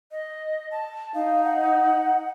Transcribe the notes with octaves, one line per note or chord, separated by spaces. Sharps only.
D#5
A5
D#4 F5
F#5